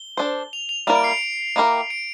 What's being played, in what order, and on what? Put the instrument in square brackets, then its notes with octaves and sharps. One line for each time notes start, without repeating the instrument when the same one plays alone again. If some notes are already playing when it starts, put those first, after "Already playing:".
Already playing: [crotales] G7
[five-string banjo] D4 A4 C5
[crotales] F7
F7
[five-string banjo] G3 A#3 E4 A#4 D5 [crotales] F7
[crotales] D7
C7
D7
[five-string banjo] A#3 E4 G4 A#4
[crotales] D7